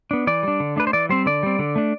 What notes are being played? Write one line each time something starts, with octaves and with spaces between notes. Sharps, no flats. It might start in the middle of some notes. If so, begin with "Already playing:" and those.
B3 D4
E3 D5
G3 D4
D3
A3 D4 B4
C5
E3 D5
G3 C4 C5
D3 D5
G3 C4
D3
A3 D4